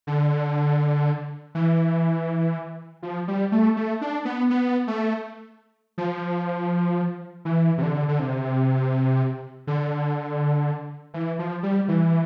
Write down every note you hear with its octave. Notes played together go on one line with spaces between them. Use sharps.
D3
E3
F3
G3
A3
A3
D4
B3
B3
A3
F3
E3
C3
D3
D3
C3
D3
E3
F3
G3
E3